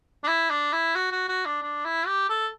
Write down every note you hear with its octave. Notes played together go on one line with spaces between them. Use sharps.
D4
E4
D4
E4
F#4
F#4
F#4
D4
D4
E4
G4
A4